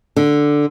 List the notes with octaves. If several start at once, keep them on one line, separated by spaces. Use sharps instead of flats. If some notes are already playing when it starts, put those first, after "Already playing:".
D3